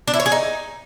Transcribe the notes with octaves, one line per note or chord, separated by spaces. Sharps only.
D4
E4
C#5
G#4
D#4